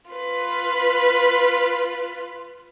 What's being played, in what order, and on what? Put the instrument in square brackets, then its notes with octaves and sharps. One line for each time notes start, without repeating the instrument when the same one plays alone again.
[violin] F4 B4